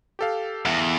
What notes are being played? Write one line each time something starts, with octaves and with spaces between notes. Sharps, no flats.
G4 A4 F5
E2